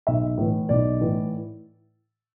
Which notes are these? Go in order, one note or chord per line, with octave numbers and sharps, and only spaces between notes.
B1 E5
A2 E3
B1 D5
A2 E3